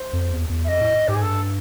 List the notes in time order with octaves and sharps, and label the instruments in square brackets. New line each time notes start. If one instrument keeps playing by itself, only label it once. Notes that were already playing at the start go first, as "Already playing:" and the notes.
Already playing: [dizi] C5
[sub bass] F2
E2
E2
[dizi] E5
[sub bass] F2 [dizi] D#5
[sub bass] A2
[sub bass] G#2 [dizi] G4
[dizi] G#4
[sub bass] G2 [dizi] A4